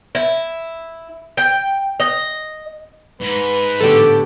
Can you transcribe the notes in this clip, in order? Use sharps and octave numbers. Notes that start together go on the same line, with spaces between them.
E4
G5
D#5
G#2 B4
A2 D3 B3 G4 A4